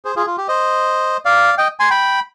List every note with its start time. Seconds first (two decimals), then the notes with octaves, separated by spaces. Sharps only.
0.05 G#4 C5
0.16 F4 G#4
0.26 F4
0.38 G4
0.48 C5 D#5
1.25 D5 F5
1.58 D#5 G5
1.80 G#5 C6
1.90 G5 B5